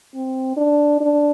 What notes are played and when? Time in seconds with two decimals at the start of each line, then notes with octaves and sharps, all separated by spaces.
0.15 C4
0.56 D4
1.01 D4